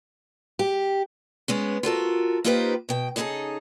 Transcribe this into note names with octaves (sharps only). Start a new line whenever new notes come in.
G4
G#3 B3 C#4
F4 F#4 A4 A#4
A#3 D#4 F4 G4 B4 C5
B2 G5
C#3 D#4 E4 F#4 G#4 A4